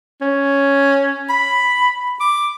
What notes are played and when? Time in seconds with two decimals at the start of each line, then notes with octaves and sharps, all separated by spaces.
0.21 C#4
1.30 B5
2.20 D6